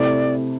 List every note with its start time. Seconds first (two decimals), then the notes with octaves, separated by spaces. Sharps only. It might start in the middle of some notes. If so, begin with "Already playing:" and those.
Already playing: C3 A3 E4 D5